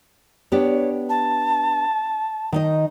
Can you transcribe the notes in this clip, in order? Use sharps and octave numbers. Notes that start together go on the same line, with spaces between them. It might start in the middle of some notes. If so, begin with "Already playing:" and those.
B3 D4 G4 C#5
A5
D#3 D#4 D#5